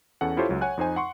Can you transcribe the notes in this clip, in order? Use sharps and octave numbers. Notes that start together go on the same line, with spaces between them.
E2 C#4 A4 F#5
E4 F4 G4 A4 C5 C#5
C#2 F#3
C#5 F#5 G#5 F#6
F2 D#4 C5 G#5
F#5 C6 C#6